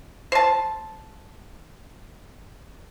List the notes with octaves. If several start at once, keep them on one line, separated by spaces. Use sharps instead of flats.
C5 A5